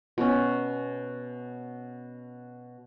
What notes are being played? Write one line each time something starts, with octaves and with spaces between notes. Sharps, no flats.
B2 C#4